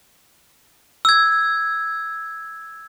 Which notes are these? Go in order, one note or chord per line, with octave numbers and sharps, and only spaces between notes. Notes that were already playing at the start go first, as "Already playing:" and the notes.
E6 G#6